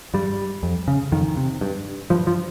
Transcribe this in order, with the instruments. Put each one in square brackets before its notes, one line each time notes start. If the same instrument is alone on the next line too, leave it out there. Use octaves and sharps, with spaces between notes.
[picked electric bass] G2 G3
F2
C#3
F2 D#3
C3
G2
G2 F3
F3